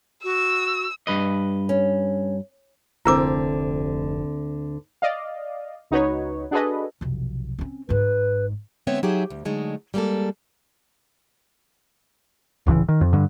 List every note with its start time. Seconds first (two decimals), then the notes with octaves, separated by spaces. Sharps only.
0.24 F#4 E6
1.07 G2 B4 D#5
1.69 C#4
3.05 F1 D2 D3 C4 E4 A#4 D6
5.02 D5 D#5 F5
5.91 C#2 D#4 F#4 B4 C#5
6.51 D4 F#4 G#4 A4 B4 D#5
7.01 F1 B1
7.59 C4 C#4
7.89 G#1 G#2 B4
8.87 D3 G#3 B3 C4 C#5 E5
9.03 F#3 D#4 G4 G#4 E5
9.30 D2
9.45 D3 F#3 G#3 A3 D#4
9.94 G3 G#3 A#3 D4 A4
12.66 D1 C#2 C3 E3
12.89 D#3
13.01 F2
13.13 G2 D3